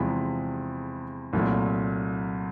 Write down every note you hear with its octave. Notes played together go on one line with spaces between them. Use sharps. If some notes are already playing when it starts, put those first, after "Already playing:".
Already playing: E2 C3 F3 G#3 B5
C2 A#2 F#3 A3